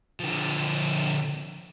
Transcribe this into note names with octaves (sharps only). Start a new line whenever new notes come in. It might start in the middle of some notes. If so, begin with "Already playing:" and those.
D3 F3